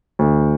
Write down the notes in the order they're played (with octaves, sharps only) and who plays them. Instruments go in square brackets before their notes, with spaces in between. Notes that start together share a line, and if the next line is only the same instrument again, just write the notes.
[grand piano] D2